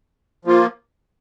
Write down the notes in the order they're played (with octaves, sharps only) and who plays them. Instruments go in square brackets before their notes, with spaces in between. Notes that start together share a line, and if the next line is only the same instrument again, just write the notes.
[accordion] F3 A#3 F4